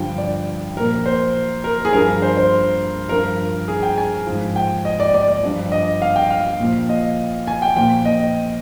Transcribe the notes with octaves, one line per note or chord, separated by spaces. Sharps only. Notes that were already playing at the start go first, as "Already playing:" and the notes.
Already playing: G2 D3 F3 G5
D5
A#2 F3 A#4
C5
A#4
G#4
G2 F3 A#4
C5
C5
G2 F3 A#4
G#4
G5
G#5
G#2 F3
G5
D#5
D5
D5
D5
G2 F3
D#5
F5
G5
F5
A#2 F3
D#5
G#5
G5
A#2 F3 G5
D#5